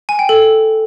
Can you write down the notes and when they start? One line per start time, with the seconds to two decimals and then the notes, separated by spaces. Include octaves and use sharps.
0.09 G#5
0.19 G5
0.29 A4